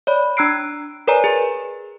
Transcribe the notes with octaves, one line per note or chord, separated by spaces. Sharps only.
C#5 D5 B5
D4 A#5 E6 F#6 C7 D7
A#4 B4 C#5 D5 G#5 A#5
G#4